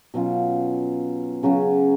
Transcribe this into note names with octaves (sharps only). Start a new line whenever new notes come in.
B2 F#3 C#4 F4
C#3 F#3 C#4